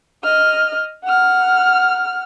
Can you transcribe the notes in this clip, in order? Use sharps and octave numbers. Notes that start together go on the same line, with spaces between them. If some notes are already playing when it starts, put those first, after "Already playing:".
D#5 F6
F#5 F6